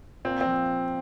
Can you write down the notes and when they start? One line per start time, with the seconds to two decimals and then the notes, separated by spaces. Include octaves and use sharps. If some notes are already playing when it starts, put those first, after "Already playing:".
0.25 A#2 C4
0.41 F3 C4